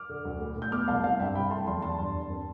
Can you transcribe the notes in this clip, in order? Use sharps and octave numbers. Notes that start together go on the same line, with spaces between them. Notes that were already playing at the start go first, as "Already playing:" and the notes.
Already playing: D6 F6
D3
D2
A2
A2
G6
B3 D6 F6
C2 F5 A5
C4 F5 A5
G2 E5 G5
C2 G5 B5
A3 A5 C6
E2 A5 C6
E2 A5 C6
G2
G2
C4